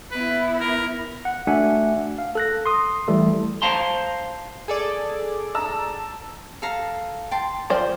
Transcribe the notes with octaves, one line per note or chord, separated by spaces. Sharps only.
B3 E4 B4
A#4
F#5
A3 D4 F#4 E5 F#5 G#5
F5
A4 F#6 A#6
C6 D#6
E3 G3 A3 A4
C5 F5 A5 A#5 C6
G#4 A4 D5
A5 A#5 E6
A4 F5 A#5
G5 A5 C6
F3 G4 C5 D5